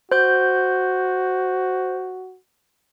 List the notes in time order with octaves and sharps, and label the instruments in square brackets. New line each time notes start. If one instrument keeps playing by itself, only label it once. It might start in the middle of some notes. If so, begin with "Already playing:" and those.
[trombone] F#4 [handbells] C5 G6